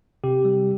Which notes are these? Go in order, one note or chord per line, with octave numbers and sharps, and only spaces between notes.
C3 G4
G3